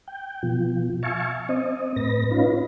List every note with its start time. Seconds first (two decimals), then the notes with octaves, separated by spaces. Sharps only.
0.08 G5
0.43 B2 F3
1.03 E5 F5 G#5 A5 C#6
1.49 C4 D#5
1.96 A2 B4 A#6
2.31 C#4 D#4 F4 B4